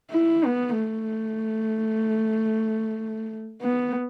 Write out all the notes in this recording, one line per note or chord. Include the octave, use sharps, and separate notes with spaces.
E4
B3
A3
B3